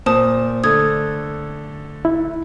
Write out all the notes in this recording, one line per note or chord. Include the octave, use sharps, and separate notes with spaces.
A#2 C5 A5 D#6
D3 A3 D#6 G#6
E4